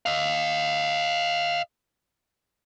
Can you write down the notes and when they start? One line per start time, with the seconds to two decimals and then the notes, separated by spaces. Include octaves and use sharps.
0.06 D#5 F5